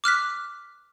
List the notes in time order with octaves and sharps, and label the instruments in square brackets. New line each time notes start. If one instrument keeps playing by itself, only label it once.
[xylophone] D6 F6 F#6 B6